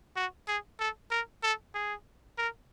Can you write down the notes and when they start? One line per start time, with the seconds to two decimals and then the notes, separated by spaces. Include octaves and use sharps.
0.16 F#4
0.47 G#4
0.79 A4
1.11 A#4
1.43 A4
1.74 G#4
2.38 A#4